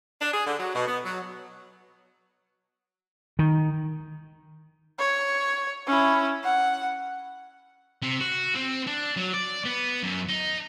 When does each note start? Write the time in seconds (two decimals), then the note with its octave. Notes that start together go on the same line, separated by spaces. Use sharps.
0.22 D4
0.34 G#4
0.47 D3
0.59 F#3
0.75 B2
0.88 B3
1.05 F#3
3.39 D#3
4.99 C#5
5.87 C#4 E4
6.44 F#5
8.02 C3
8.20 F#4
8.55 C4
8.87 D4
9.17 F#3
9.33 D5
9.66 B3
10.03 F#2
10.28 D#4